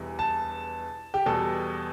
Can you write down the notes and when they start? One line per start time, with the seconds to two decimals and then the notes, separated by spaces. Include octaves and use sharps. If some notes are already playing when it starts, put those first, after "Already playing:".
Already playing: E1 E2 E3 G3
0.19 A5
1.14 G4
1.26 E2 B2 G3 A4